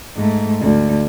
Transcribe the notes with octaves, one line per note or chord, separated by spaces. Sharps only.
G#2 A3
D2